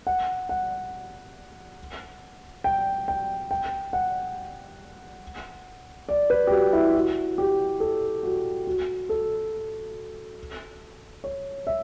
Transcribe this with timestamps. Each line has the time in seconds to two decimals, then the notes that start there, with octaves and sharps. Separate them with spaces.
0.07 F#5
0.49 F#5
2.64 G5
3.08 G5
3.51 G5
3.93 F#5
6.09 D5
6.30 B4
6.47 G4
6.51 F#4
6.73 E4
6.95 F#4
7.38 G4
7.80 A4
8.23 F#4
8.67 F#4
9.09 A4
11.24 C#5
11.67 E5